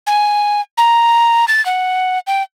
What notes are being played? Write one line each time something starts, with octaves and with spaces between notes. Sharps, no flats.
G#5
A#5
A6
F#5
G5